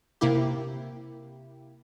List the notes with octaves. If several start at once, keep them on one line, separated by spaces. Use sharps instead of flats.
C3 A#3 E4 G4